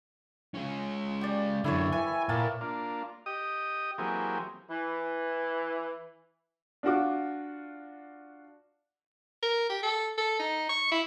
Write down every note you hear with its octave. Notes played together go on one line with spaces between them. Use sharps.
G#3 C#4
G4 D5
F#2 D3 E4 A4 C#5
E3 G#5
A#2 A#3 A5
A#3 D4 F4
G4 D#5 D#6
E3 F#3 A#3 C4 G4 G#4
E3
D4 F4 F#4 D6
A#4
G4
A4
A4
D#4
C#6
E4